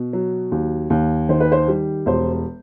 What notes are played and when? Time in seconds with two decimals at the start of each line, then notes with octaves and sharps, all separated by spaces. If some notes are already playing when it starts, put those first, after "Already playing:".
Already playing: B2
0.13 F#3
0.52 D#2
0.90 D#2
1.29 D#3 C5
1.40 B4
1.52 C5
1.68 G3
2.06 E1 C5